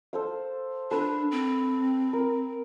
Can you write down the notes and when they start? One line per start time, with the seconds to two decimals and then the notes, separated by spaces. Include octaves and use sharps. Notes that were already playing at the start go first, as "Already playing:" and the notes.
0.13 A4 C5 F5
0.91 D4 A4 B4
1.32 C4
2.13 A#4